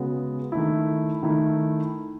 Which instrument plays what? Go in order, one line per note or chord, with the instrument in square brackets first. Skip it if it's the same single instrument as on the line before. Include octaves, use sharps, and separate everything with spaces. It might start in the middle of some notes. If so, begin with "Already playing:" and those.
Already playing: [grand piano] C#3 G#3 B3 F#4
D#3 A3 E4
D#3 A3 E4